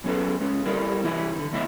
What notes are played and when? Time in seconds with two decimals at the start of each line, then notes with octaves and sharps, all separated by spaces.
0.04 F#2 B2 C#4 G#4 A4 B4
0.40 G#3 C#4
0.66 G3 C4 E4 A4 A#4 D5
1.04 C3 E3 E4 E5
1.35 D3 D#3
1.52 E2 C#3 A3 E4 D#5 E5